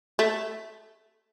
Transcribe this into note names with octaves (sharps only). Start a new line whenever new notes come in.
A3